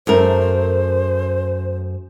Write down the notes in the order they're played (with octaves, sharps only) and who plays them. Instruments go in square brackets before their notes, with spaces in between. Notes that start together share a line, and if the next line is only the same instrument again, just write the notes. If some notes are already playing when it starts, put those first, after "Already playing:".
[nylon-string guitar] F#2 A3 A#4 [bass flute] C5